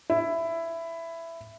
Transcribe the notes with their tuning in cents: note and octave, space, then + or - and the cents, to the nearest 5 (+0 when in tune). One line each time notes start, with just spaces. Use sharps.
E4 +10